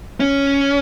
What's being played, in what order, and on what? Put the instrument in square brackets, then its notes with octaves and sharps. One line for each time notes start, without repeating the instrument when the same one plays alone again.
[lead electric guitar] C#4